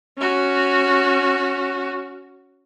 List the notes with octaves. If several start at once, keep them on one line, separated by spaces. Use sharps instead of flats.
C#4 F#4